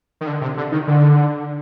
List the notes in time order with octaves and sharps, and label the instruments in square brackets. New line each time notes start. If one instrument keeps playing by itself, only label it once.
[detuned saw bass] D#3
D3
C3
D3
D#3
D3